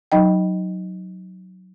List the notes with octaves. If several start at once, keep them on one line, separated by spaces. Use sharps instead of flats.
F#3 D#4 D#5 G5